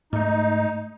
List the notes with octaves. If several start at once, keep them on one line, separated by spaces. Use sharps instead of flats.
G#2 A3 D#4